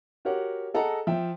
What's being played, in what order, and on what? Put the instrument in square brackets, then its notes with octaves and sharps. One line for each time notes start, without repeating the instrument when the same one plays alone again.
[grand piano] F#4 G4 A#4 C#5 F#5
G#4 A4 D#5 F#5 A#5
F3 E5 G5